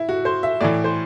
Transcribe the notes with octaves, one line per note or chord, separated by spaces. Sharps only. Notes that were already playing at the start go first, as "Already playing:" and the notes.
Already playing: E4
F#4
C5
E5
A2 E3 D5
C5